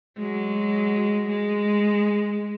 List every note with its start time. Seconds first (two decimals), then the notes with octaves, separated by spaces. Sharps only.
0.18 F#3 G#3
1.29 G#3